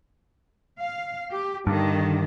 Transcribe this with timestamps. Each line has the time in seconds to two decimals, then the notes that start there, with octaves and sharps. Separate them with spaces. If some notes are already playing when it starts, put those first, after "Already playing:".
0.80 F5
1.30 G4
1.67 G2 D3 D#3